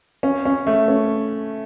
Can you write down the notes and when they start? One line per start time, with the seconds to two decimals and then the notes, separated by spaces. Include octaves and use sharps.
0.23 C#4
0.45 C#4
0.67 A3
0.88 C#4